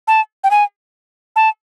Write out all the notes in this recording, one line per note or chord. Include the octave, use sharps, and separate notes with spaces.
A5
G5
G#5
A5